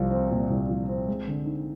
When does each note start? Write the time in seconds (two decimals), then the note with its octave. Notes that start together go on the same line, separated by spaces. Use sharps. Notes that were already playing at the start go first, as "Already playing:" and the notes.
Already playing: C2 F3
0.11 C4
0.31 A#2
0.50 C2
0.69 F3
0.89 C4
1.08 G#3
1.27 D3
1.46 D#4